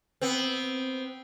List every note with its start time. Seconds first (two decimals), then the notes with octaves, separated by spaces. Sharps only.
0.21 B3 C4